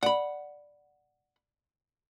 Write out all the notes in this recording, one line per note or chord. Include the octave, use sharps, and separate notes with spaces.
D5 F#5 B5